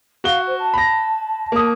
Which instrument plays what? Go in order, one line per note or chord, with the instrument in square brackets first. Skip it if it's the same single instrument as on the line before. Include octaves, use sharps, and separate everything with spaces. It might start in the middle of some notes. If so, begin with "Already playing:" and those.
[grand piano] F#4 G7 [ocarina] F5
[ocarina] C5
A5
[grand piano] B5 A#6
A#3 D#6